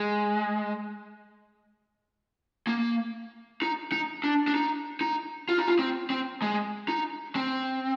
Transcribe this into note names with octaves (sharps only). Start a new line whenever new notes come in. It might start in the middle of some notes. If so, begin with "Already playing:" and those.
Already playing: G#3
A#3
D#4
D#4
D4
D4
D#4
D#4
F4
D#4
F4
C4
C4
G#3
D#4
C4